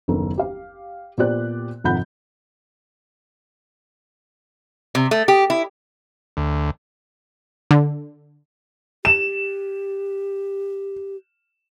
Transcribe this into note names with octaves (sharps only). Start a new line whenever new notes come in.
F#1 D#2 B3 A4
G4 F5
A#2 B3 G4 C5 D5 F#6
G#1 F2 C3 F#5 B5 G6
C3
A3
G4
E4
D2
D3
G4 E7